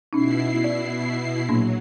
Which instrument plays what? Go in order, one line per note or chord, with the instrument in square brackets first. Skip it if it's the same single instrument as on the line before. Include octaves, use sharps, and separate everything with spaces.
[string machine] B2 E4 C7 [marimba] C#4 D#4
[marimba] D5
[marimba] A#2 A#3 D4 [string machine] F#3